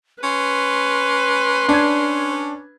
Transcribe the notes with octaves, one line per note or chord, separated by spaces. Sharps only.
C#4 B4 C6
C#4 D4 G#6